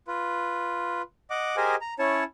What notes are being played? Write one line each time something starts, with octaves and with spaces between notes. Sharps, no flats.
F4 B4
D#5 F#5 D6
G4 G#4 A#4 C5 D#5 G#5
A#5
C#4 E4 C#5 A5